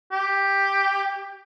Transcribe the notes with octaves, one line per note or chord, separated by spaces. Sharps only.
G4